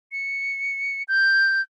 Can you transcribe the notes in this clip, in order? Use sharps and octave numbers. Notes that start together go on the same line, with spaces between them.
C#7
G6